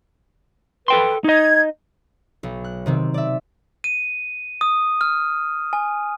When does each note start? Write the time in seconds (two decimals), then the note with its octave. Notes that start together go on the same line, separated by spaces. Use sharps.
0.88 A4 B4 G5 C6
1.24 D#4 D#5 G#6
2.43 B1
2.64 F#6
2.86 C3 D#3 C4
3.14 D5 E5
3.84 D#7
4.61 D#6
5.01 F6
5.73 G#5